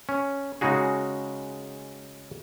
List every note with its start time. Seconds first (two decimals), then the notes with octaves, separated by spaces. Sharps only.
0.09 C#4
0.61 C#3 G#3 D#4 F#4 G#4